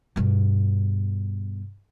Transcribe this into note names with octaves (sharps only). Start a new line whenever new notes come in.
G2 B2